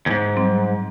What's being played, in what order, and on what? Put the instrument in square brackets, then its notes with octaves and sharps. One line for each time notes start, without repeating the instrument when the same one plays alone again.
[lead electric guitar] D#2 G#2
[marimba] F#3 G3 C4